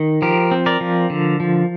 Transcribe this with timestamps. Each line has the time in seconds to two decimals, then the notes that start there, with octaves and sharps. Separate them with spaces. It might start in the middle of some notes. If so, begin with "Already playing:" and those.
Already playing: D#3
0.22 F3 G4 A#4
0.51 C4
0.66 A#4 D5
0.81 F3
1.10 D3
1.40 F3